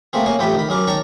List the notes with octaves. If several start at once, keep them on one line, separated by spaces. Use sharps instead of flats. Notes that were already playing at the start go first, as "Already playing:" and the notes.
A3 A#3 C4 G#4
A#3 C#4 G#4 G#5
A1 F2 A3 G4 B5
D#3 B5
F#2 G#4 A#4 D6
D#3 C#5 A5 A#5 C#6